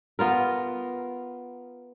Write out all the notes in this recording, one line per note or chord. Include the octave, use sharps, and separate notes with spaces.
B3 F4 A#4